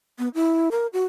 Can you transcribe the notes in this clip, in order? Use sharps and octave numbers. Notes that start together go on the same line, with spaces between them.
B3
E4
A#4
F#4